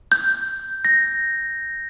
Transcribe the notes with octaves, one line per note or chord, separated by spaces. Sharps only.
G6
A#6